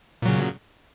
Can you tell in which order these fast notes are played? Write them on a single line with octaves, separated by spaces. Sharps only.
A#2 F#3 C#3